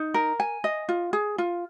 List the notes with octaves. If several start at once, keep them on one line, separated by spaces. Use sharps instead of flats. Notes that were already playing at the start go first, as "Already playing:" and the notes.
Already playing: D#4
A#4
G#5
D#5
F4
G#4
F4